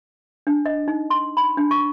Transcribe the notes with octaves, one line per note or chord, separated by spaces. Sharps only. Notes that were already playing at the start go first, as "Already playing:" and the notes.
D4
D#5
D#4
C6
B5
D4
C#6